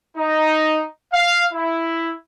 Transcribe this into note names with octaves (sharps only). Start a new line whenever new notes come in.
D#4
F5
E4